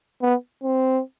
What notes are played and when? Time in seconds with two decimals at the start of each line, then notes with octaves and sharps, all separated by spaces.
0.22 B3
0.63 C4